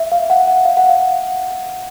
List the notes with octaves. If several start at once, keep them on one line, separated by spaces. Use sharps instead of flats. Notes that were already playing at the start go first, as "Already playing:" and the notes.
Already playing: E5
F5
F#5
F#5
F5
F#5
F5